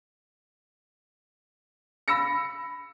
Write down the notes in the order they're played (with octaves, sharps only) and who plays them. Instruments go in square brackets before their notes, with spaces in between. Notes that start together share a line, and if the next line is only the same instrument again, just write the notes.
[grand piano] B5 E6 A#6 C#7